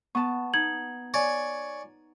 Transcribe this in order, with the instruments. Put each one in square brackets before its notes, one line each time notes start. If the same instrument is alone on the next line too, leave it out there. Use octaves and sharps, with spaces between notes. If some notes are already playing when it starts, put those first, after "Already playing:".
[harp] B3 A5 [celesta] C#6
[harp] D#4 [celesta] G#6 F#7
[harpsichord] C#5 D5 G#5